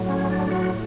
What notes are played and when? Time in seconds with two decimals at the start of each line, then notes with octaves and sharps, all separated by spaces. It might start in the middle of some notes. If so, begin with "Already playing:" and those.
Already playing: A2 F#3
0.09 C#4
0.30 D4
0.51 F#3 F#4